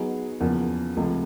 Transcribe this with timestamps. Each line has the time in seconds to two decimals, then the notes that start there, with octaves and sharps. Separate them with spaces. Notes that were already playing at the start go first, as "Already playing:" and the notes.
Already playing: F#3 B3 D#4 G#4
0.40 E2 C#3 F3 A#3
0.97 C#2 C3 F3 A3